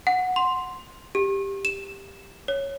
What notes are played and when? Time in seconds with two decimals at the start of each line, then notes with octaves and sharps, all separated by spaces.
0.07 F#5
0.36 C6
1.15 G4
1.65 E7
2.48 C#5